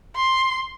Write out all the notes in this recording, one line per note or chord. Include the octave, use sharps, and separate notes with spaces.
C6